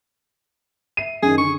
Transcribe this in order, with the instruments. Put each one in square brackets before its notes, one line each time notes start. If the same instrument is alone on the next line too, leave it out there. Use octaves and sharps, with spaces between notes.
[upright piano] E5 C7 D#7
[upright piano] F#2 D#3 [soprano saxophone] G#4
[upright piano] D3 [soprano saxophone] C#6